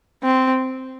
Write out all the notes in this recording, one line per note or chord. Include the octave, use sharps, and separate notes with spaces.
C4